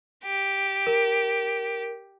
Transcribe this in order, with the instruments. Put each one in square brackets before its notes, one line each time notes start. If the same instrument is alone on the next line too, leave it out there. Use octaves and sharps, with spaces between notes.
[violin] G4
[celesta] A#4